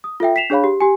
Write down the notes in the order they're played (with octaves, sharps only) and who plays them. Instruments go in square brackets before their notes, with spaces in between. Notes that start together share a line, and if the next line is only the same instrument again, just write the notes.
[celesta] D#6
F4 A4 E5 G5
B6 C7 E7 F7
D4 G#4 C#5 F5 B5
G4
G4 G#5